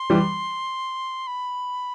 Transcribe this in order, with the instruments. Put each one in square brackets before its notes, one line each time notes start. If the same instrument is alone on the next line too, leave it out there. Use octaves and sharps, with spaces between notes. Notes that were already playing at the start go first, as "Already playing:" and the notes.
Already playing: [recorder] C6
[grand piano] E3 G3
[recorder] B5